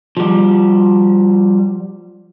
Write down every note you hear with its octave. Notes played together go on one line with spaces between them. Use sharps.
F3 G3